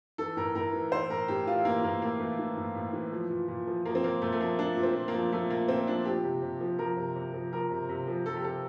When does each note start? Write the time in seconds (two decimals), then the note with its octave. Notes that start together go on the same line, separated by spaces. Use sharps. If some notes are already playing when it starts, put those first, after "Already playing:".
0.18 E3 A4
0.37 A2 A#4
0.55 A2 A#4
0.73 E3
0.92 E3 C5
1.10 A2 A#4
1.28 A2 G4
1.47 E3 F4
1.65 E3 A#3
1.83 A2 A#3
2.02 A2 A#3
2.20 E3 A3
2.39 E3
2.57 A2
2.76 A2
2.93 E3
3.12 F3
3.30 A#2
3.48 A#2
3.67 F3
3.85 F3 A#3
3.95 C4
4.03 A#2 A#3
4.22 A#2 A3
4.32 A3
4.40 F3 A#3
4.59 F3 D4
4.76 A#2
4.83 C4
4.95 A#2
5.08 A#3
5.14 F3
5.32 F3 A3
5.50 A#2 A#3
5.68 A#2 C4
5.87 F3 D4
6.05 F3 G4
6.24 C3
6.42 C3
6.61 F3
6.79 F3 A#4
6.97 C3
7.16 C3
7.33 F3
7.52 F3 A#4
7.70 C3
7.89 C3
8.07 F3
8.26 F3 A4
8.37 G4
8.44 C3 A4